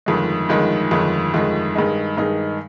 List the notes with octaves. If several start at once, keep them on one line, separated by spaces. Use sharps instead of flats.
G1 F2 D#3 G#3
G1 F2 D#3 G#3
G1 F2 D#3 G#3
G1 F2 D#3 G#3
G2 D#3 G#3 D#4 G#4
G2 D#3 G#3 D#4 G#4